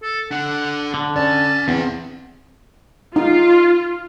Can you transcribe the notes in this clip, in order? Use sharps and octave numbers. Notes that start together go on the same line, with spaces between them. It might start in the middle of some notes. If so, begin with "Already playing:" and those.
A4
D4 A4 F#5
D3
C#4 D5 A5
E2 C4 G#4 F#5
D#4 F4